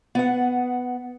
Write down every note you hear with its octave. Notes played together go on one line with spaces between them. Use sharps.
B3 F#5